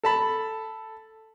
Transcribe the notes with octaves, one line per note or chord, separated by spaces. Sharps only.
A4 A5 B5